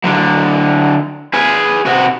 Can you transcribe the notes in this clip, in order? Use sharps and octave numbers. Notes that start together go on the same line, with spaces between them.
D3 F#3
G#4 B4
C3 F#4